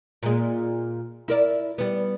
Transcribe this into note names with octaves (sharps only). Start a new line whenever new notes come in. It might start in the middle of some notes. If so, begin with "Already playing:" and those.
A#2 G#3
E4 A#4 D5
G3 B3